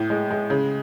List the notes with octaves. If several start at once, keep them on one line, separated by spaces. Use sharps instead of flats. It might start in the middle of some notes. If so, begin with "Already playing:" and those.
Already playing: A2
G#3
G#3
C#3